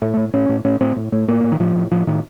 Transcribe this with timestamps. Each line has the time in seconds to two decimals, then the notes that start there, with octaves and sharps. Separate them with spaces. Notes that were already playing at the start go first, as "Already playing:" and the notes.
0.02 A2 A3
0.17 A2
0.33 A2 C#4
0.49 A2
0.64 A2 C#4
0.80 A2 C4
0.96 A2
1.12 A2 A3
1.28 A2 A#3
1.44 A2
1.52 D#3
1.59 A2 F3
1.75 A2
1.91 A2 F3
2.07 A2 D#3